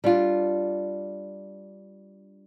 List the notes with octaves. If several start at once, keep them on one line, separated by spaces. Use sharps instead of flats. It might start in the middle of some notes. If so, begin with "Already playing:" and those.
G3 D4 F4